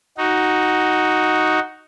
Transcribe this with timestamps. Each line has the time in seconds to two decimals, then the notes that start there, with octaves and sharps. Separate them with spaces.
0.18 D#4 F#4